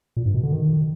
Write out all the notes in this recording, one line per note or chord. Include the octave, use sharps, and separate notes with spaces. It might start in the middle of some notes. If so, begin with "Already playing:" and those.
A#2
G2
B2
D3
D#3